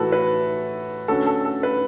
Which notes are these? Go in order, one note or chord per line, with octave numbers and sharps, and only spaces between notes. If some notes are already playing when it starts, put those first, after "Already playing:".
Already playing: A2 E3 A3 E4 F#4 A4 B4
B4
D3 A3 C#4 F#4 A4
A4
A4
B4